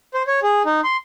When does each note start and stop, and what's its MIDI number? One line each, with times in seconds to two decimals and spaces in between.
0.14 0.23 72
0.28 0.40 73
0.43 0.62 68
0.66 0.81 63
0.84 0.97 84